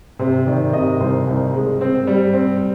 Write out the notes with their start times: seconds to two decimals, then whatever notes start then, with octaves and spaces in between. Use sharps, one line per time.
0.19 C3 C5
0.47 D#3 D5
0.73 C3 D#5
1.00 C2 C5
1.27 C2
1.54 G#3
1.81 C4
2.07 G3
2.34 C4